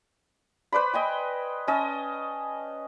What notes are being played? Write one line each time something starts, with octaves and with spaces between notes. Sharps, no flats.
B4 C5 D5 B5
D#5 G5 G#5
C#4 D#5 A5